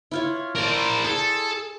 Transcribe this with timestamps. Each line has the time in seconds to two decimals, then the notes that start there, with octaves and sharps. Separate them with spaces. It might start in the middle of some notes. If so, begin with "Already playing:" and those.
0.11 E4 F4 C#5
0.56 A#4 C5 D5 A5
1.04 G#4 A4 C6